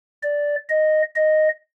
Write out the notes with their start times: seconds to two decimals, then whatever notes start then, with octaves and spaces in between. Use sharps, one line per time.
0.23 D5
0.69 D#5
1.16 D#5